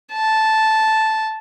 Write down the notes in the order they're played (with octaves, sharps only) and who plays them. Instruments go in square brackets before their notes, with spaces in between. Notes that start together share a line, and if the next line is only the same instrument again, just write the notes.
[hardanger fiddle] A5